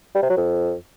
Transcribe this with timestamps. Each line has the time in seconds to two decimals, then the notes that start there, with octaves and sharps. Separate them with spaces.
0.15 G3
0.22 C3
0.30 F#3
0.37 F2